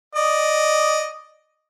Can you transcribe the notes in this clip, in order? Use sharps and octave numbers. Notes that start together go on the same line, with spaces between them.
D5 D#5